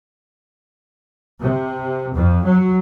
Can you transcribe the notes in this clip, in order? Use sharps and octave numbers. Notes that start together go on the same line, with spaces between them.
C3
F2
F#3